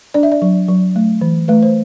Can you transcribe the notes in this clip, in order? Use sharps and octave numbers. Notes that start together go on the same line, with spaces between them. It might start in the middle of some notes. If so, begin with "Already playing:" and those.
D4 D5
E5
D5
F#3
F#3
A3
E3
A3 B4
C5